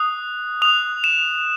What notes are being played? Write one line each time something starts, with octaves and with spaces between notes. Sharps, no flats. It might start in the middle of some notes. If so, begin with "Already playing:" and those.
Already playing: D#6 F#6
D#6 F#6 F7
E7